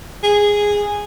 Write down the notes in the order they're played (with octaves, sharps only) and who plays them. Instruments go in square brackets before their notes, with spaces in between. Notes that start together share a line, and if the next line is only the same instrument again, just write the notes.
[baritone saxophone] G#4